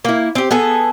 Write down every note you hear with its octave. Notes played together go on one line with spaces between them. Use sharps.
A#3 E4
C4 G4
B3 G#4 A4